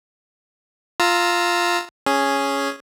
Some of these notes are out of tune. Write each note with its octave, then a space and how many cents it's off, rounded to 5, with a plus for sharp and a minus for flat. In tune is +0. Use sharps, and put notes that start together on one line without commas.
F4 +0 A#5 -15 E6 -10
C#4 +0 G#4 +0